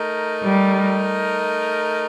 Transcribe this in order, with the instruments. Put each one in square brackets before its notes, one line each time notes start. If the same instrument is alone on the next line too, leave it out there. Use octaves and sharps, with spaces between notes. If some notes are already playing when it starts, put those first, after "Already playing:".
Already playing: [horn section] A3 D#4 A#4
[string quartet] G3